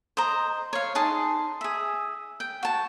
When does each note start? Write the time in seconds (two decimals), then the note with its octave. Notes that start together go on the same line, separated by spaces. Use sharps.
0.17 C5 D#5 A#5
0.73 C#5 F5
0.95 D#4 G#4 A5 C6
1.61 G#4 E5
2.40 G5
2.63 F#4 A5